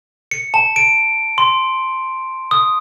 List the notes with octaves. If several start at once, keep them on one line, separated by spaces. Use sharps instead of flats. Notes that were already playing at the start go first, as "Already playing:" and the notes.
C#7
A5
D7
C6
D#6